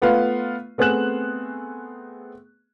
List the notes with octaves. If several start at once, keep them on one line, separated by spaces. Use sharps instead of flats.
A3 B3 F4 B4 F5
A3 B3 C4 G#4 F#6 E7